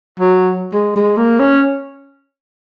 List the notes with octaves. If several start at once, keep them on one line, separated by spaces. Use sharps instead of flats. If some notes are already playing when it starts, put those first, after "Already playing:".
F#3
G#3
G#3
A#3
C#4